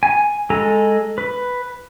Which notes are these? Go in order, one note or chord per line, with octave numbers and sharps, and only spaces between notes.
G#5
G#3 A4 G#5 A#5
B4